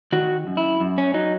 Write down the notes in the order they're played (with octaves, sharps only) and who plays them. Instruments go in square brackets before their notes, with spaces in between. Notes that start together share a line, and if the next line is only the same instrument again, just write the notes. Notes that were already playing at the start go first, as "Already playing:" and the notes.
[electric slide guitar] D#3 F#4
F#2
E4
F#2
C#4
F#3 D#4